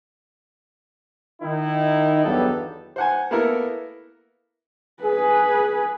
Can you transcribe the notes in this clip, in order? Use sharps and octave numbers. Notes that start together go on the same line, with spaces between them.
D#3 D#4 E4
E2 G2 F#3 B3 G4 A4
C5 F#5 G#5
A#3 B3 E4 A4 A#4
G#4 B4